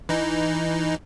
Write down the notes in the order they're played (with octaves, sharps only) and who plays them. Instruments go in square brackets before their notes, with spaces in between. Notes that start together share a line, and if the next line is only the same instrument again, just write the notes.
[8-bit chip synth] E3 D#4